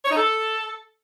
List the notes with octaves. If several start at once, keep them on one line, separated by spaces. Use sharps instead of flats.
C#5
D#4
A4